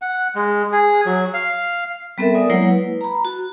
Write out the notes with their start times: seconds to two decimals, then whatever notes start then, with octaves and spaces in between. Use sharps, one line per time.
0.02 F#5
0.35 G#3
0.72 G#4
1.06 F#3
1.34 F5
2.18 G3 B3 C4 A4 A#4 E5
2.35 D5 G#5 D#6
2.50 F#3 G#3 A#3 E4 C#5 F#5
2.70 B4
3.01 A#5 B5
3.25 F#4